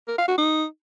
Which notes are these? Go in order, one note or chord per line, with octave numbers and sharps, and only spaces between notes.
A#4
F5
F#4
D#4